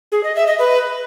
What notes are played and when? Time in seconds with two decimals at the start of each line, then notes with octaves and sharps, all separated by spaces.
0.12 G#4
0.24 D#5
0.35 E5
0.47 D#5
0.59 B4